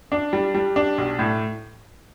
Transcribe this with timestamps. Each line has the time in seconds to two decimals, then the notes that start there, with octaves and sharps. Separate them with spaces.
0.12 D4
0.33 G3
0.54 G3
0.76 D4
0.98 B1
1.19 A2